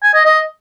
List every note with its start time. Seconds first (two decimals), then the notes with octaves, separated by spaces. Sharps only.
0.03 G#5
0.14 D#5
0.25 D#5